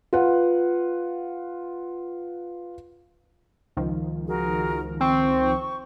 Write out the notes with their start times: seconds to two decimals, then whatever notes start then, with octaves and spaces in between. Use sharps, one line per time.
0.13 F4 B4 F#5
3.77 C#2 D#3 F3
4.27 F#4 G#4 A#4
5.01 C4 C#6